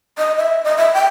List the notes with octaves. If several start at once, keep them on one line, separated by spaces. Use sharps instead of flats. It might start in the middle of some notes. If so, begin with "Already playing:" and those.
D#5
E5
D#5
E5
G5